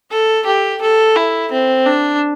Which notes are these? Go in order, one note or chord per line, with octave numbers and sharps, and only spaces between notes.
A4
G4
A4
E4
C4
D4